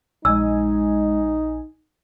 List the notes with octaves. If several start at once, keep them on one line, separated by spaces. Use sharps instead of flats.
A#1 G#3 D#4 G#5 E6